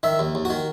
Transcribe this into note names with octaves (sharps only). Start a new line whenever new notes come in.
D#3 E5
D#2
D#2
F#4
D#3